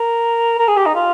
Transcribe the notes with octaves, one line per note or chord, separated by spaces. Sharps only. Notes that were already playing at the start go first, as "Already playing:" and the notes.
Already playing: A#4
A#4
G#4
G4
D#4
F4